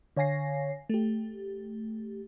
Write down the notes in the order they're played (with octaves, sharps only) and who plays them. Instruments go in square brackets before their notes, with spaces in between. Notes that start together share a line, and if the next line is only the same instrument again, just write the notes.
[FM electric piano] D3 C#5 F5 G#5 A#6 C7
A3 G4